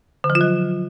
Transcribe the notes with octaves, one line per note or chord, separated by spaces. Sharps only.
D3
F3
F4
F#3